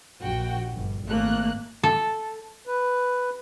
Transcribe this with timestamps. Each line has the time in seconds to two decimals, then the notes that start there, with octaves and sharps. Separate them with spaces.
0.20 A#1 F#4 G5
0.75 G1
1.06 G#1 A3 A#3 F#6
1.83 A4
2.67 B4